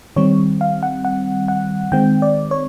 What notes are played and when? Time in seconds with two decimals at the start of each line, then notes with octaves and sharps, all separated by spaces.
0.16 D#3 G3 C4 C#5
0.61 F5
0.83 F#5
1.05 F#5
1.48 F#5
1.92 D#3 G#3 C4 G5
2.22 D5
2.51 C#5